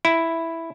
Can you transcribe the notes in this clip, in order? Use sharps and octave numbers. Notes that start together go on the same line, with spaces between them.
E4